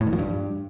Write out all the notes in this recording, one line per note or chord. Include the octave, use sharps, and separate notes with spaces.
A2
D#3
F3
G2